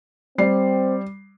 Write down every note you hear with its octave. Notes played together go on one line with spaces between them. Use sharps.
G3 C4 D5 C7